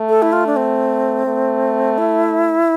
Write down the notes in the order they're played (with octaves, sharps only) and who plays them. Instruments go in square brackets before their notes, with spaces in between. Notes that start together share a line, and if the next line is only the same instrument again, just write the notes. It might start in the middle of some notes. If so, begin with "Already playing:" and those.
Already playing: [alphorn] A3
[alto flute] A4
E4
F4
D4
C4
[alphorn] A3
[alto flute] E4